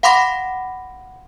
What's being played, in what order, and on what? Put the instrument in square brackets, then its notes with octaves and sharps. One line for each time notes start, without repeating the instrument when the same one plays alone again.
[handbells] F5 F#5 B5 C6 D6 A#6